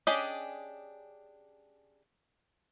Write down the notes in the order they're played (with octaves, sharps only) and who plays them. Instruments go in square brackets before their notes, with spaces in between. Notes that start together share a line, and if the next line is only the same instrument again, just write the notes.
[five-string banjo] C#4 D4 G4 G#4 D#5